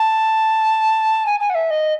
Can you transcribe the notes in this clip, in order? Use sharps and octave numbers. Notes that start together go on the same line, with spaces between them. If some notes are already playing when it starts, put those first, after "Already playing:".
Already playing: A5
G#5
G#5
F#5
E5
D#5